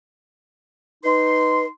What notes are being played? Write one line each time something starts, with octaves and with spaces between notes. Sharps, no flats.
D#4 B4 C6